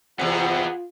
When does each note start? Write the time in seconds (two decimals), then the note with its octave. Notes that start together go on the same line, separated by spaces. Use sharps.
0.19 E2 C3 B3 F4 G#4 F#5